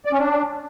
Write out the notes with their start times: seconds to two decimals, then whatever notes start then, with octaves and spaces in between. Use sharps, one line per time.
0.05 D5
0.12 C#4
0.19 D4